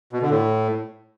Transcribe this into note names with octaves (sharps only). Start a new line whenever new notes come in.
B2
D3
A2